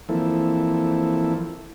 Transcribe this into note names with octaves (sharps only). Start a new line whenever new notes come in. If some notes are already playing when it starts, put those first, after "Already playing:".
E3 F3 A#3 C4 E4 A4